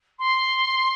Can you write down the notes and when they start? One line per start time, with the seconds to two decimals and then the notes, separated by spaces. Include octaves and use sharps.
0.19 C6